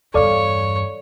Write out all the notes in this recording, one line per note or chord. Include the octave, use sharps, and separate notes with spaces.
E2 G2 A4 C#5 D5 F5